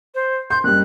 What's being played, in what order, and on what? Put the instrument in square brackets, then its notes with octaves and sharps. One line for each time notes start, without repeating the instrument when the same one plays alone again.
[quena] C5
[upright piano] C6 [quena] G6
[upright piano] F#1 G3 [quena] F#6